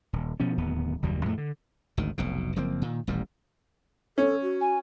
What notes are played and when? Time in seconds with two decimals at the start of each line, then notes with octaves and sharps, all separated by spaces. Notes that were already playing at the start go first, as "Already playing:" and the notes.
0.13 D#1
0.40 B2 F3 C#4
0.58 D1 D#2 B3
1.02 F#1 D#2 B2 G3
1.25 F2 A2 G#3 A3
1.38 D3
1.97 G#1 D2 D#3
2.18 F1 B1 B2
2.56 F#1 F3 A#3 C4
2.82 A#2 D#3
3.07 D#1 A1 A#2 G3
4.18 C#4 A4
4.42 F#4
4.61 G#5